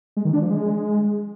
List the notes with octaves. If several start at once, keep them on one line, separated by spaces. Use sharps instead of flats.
G#3
D#3
D4
F3
G#3